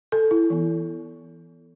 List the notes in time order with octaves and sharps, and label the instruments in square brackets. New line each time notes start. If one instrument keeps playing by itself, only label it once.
[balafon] A4
E4
E3 B3